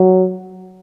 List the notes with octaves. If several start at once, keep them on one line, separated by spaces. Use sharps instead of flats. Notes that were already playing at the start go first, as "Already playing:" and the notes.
Already playing: F#3